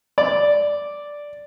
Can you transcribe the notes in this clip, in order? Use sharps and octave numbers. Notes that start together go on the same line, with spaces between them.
D5